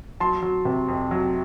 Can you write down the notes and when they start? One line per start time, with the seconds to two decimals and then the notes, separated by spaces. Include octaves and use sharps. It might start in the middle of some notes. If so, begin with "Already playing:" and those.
0.20 F#3 A5 C6
0.42 F#3
0.65 C3
0.88 F2
1.11 F#3